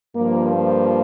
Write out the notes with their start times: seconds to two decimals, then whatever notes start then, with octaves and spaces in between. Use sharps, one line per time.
0.14 G2 F3 A#3
0.56 A#3